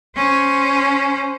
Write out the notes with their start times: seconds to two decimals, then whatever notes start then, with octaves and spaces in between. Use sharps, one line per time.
0.16 C#4 C5